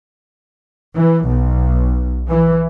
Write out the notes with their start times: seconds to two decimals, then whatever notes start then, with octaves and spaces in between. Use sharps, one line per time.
0.95 E3
1.27 B1
2.29 E3